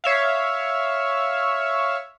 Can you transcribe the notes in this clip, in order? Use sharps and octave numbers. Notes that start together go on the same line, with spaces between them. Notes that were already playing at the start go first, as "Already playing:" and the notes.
C#5 E5 F5